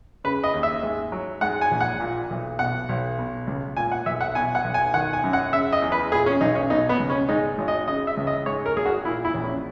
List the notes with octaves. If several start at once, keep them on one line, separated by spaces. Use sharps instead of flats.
C#3 B4
D#5
D#2
E5
G#2
F#3
G#2 F#5
G#5
A#1
F#5
A#2
B1
B2 F#5
B1
B2
C#2
A#2 G#5
F#5
B1 E5
F#5
B2 G#5
F#5
B1
G#5
D#3 F#5
G#5
F#2
F#5
C#3 E5
D#5
E2
B4
A#2 G#4
C#4
B1 D#4
C#4
B2 D#4
B3
C#2
C#4
G#2 D#4
G#1
D#5
C#3 D#5
E5
C#2
D#5
G#2 C#5
A#4
G#1 G#4
F#4
A#2 E4
E4
A#1
C#4